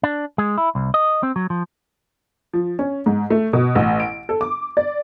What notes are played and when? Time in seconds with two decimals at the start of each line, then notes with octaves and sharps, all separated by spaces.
0.03 D4
0.38 G#3
0.58 E4
0.75 C2
0.94 D#5
1.23 C4
1.36 F#3
1.50 F3
2.53 F3
2.79 C#4
3.06 G#2
3.30 A3
3.53 B2
3.75 A1
4.00 D7
4.29 A4
4.41 D6
4.77 D5